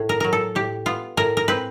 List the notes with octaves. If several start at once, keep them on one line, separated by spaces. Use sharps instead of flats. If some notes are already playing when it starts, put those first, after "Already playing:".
Already playing: A2
A#4
F#3 A#4
A4
A2 G4
B3 F4
A2 A#4
A#4
C4 B4